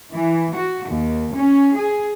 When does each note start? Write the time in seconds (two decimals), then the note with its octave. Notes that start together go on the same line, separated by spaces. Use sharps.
0.13 E3
0.54 F#4
0.89 D#2
1.34 C#4
1.76 G#4